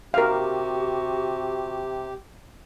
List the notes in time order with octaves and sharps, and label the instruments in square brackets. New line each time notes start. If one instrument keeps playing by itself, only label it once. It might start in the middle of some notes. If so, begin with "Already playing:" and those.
[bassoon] C3 [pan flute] F#4 [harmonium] G4 [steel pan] A#4 F5